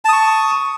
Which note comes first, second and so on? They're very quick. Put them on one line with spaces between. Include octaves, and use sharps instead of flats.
A5 D#6 C#6